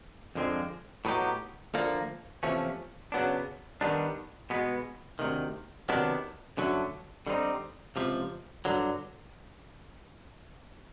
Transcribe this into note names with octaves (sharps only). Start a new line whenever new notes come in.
F2 D3 F3 G#3 C4
A2 F#3 B3 D#4 G4
D2 D3 F3 A#3
E2 C3 F3 A3 C#4
C#3 F#3 B3 D4
D#3 G3 B3 D4
B2 G#3 B3
D2 C3 D#3
C3 D#3 F#3 B3 D4
F#2 D3 F#3 A3
D3 G3 C4 D#4
C#2 C3 F3
G2 D3 F#3